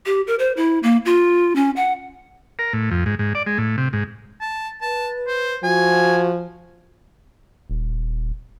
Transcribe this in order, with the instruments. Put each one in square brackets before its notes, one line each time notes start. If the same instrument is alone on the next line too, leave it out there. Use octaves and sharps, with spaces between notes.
[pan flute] G4
A#4
C5
E4
A#3
F4
C#4
F#5
[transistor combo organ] A#4
A2
F2
G#2
G#2
D5
G#3
A2
C3
G#2
[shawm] A5
[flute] B4 [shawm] A5
[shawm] C5
[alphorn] F3 [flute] F#4 [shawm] G#5
[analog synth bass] D#1